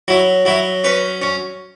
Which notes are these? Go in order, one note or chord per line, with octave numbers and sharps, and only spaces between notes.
F#3 E4
F#3 E4
C#4 B4
C#4